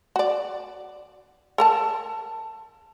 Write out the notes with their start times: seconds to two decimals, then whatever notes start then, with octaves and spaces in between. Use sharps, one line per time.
0.16 F#4 D5
1.58 A4 A#4 A5